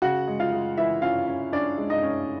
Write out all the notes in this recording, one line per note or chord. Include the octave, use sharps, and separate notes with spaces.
C#3 F#4 F#5
G#3
F4 F5
G#3
E3 E4 E5
C#4 F4 F5
C#4
C#4 D4 D5
G#3
D#4 D#5
C#4